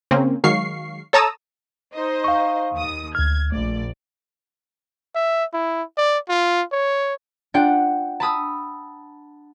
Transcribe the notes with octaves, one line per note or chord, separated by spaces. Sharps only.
C#3 A#3 C4 C#4
D#3 F#3 G#3 F5 C#6 C7
A4 C#5 A5 A#5 D#6 E6
D#4 C5 D#5
F5 C#6
D#2 D#6
D2 F6 G#6
A#1 A3 D5
E5
E4
D5
F4
C#5
D4 F4 F#5 G5
A5 B5 D#6 E6